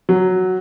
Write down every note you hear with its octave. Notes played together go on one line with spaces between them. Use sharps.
F#3